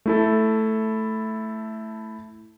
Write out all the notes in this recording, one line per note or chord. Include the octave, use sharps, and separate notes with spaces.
A3 E4 A4